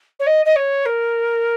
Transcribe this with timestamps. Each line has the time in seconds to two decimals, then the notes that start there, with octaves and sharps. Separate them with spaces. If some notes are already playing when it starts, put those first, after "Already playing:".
0.19 C#5
0.26 D#5
0.45 D#5
0.56 C#5
0.85 A#4